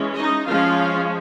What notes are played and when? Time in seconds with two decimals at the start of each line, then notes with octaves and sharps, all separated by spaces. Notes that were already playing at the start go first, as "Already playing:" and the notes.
Already playing: E3 G#3 C#4
0.16 D#4 D#5
0.48 F3 G#3 C#4 F4 F5